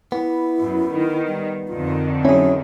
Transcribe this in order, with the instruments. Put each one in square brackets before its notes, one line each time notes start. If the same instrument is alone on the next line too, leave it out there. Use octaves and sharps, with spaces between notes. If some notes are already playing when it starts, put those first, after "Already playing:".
[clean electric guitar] B3 [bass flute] E4
[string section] F#2
D#3
[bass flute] G3
[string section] F2 D3 D#3 [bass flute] F4
[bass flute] F#3 [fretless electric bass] C#4 [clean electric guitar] E4 G#4